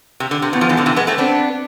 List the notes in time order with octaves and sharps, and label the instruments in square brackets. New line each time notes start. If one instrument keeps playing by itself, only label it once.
[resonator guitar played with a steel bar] C3
D3
C3
[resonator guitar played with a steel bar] A2 [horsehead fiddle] B3
[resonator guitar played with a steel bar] D3 F3
E3 G#3
D3 F3
C3 E3
G#3 B3
A3 C4
[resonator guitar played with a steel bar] B3 D4 [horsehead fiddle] C4